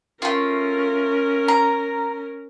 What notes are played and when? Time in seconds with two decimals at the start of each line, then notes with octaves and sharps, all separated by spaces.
0.22 A3 C#4 F4 A#4
1.48 A#5